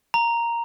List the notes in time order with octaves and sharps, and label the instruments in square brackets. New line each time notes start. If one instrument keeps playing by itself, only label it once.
[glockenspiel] A#5